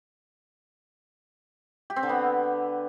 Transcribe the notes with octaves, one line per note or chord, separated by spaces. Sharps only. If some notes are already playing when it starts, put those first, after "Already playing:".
G4
C4
D3
B3